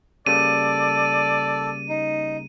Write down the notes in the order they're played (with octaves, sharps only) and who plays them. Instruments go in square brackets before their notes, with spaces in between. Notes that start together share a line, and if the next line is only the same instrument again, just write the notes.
[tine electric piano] C#3 G3 A#3 [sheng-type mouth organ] A4 [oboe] D5 [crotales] D#7
[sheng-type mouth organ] D#4